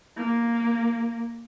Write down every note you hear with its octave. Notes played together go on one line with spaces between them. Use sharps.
A#3